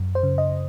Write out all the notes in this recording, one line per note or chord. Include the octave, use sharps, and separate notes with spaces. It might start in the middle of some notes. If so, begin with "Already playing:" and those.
Already playing: F#2
C5
C#3
D#5